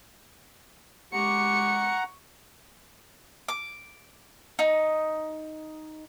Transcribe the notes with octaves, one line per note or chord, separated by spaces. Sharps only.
G#3 G4 F#5 A#5 C#6 C#7
D6
D#4